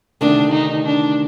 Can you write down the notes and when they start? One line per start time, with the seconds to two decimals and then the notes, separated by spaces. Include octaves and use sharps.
0.21 D2 C3 D#3 A3 D4
0.52 D#4
0.85 D4